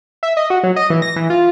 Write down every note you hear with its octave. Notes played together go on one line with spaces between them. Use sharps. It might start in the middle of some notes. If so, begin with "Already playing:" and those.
E5
D#5
F#4
F#3
D#5
E3
A#6
E3
F4